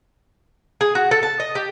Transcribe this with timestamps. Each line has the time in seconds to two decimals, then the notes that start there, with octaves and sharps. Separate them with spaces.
0.81 G#4
0.95 F#4
1.11 A4
1.23 A5
1.40 D#5
1.55 G4